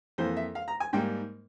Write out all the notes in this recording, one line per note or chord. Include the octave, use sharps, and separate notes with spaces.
F2 E3 A#3 C5
E5
F5
A#5
G#5
G#2 G3 A#3 G5